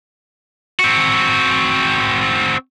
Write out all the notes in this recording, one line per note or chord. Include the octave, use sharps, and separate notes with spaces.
C4 F#4